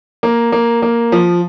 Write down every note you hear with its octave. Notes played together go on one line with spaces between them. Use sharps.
A#3
A#3
A#3
F3